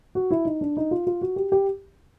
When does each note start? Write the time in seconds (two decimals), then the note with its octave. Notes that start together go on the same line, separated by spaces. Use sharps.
0.15 F#4
0.31 E4
0.45 D#4
0.61 D4
0.77 D#4
0.91 F4
1.07 F4
1.21 F#4
1.36 G4
1.52 G4